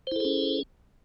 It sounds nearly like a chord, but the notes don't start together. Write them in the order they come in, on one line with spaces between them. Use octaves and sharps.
C5 E4 A4 G#4 C#4